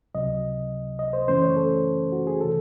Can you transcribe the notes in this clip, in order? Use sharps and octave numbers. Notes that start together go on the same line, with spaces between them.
C#2 C3 F#3 D#5
D#5
C5
F#2 C#3 E3 A3 C#4 C5
C#5
A4
F#4
G#4
C3 E3 A4